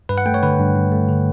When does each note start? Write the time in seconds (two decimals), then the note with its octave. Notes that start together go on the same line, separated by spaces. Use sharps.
0.09 G2 B4
0.18 F#5
0.26 A3 G5
0.34 C#5
0.43 D3 B4
0.59 G2
0.75 G2
0.92 A3
1.09 D3